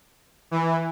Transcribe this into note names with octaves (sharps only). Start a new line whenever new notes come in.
E3